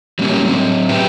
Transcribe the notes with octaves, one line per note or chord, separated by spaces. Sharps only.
F#3 G3 A#3 C#4 G4
F#3 C4
G4 G#4 B4 E5 G5